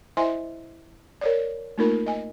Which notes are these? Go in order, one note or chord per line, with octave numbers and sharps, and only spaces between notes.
E4 C5 D#5 E5 G#5 C6
A#4 C#5 D5
A3 A#3 D#4 F4 A#4 B5
D#5 G#5